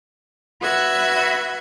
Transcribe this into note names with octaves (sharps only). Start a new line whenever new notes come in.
F#4 B4 E5 F#6 G#6